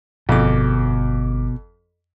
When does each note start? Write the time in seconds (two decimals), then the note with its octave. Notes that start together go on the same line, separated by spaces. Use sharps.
0.29 G1 F2 B2 D6